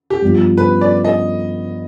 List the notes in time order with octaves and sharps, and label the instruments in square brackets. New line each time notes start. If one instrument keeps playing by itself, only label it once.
[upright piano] G4
[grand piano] G2 F3 B3 F4
[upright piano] B4
D5
D#5